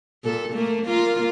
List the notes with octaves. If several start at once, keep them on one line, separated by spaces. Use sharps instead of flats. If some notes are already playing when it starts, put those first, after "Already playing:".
A#2 A4
A3 A#3
A#3 F4 A#4